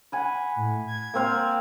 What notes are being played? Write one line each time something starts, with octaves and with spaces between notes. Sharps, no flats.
F#5 G#5 B5
A2
G#6
A#3 C4 F5